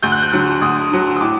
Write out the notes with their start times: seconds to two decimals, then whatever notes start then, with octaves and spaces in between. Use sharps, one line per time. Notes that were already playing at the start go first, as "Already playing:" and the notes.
0.03 D2 G6
0.12 F#6
0.22 G6
0.32 D3 F#3 F#6
0.61 D2 D#6
0.91 D3 F#3
1.16 D#6
1.21 A2 D6